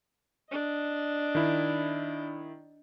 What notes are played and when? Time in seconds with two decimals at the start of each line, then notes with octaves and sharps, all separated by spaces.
0.51 D4 D#5
1.35 D#3 E4